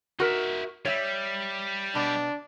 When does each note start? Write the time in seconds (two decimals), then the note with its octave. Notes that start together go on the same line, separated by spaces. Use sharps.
0.20 D#4 F#4 A#4 E5
0.85 G3 C#5 E5
1.95 B2 D4